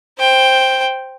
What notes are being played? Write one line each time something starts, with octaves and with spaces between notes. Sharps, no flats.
C5 G5